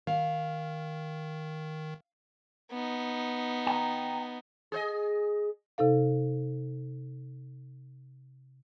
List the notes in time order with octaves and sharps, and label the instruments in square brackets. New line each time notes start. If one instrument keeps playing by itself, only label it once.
[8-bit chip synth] D#3 [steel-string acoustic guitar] F5
[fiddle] B3 D#4
[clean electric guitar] G5 A#5
[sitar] G#4 C5 D#5
[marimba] C3 D#4 A4 F5